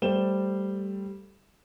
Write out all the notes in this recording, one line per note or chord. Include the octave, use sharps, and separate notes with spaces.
G3 A3 C5 E7 G7